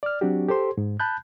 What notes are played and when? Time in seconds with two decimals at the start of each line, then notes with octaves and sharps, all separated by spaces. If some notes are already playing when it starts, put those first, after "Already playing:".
0.03 D5 F6
0.21 F#3 C4 D4 F#4 G4
0.48 G4 A4 C5 C6
0.78 G#2
1.00 A5 B5 F#6 G6